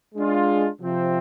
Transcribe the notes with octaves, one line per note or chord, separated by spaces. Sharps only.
G#3 D4 F4
C3 F3 C4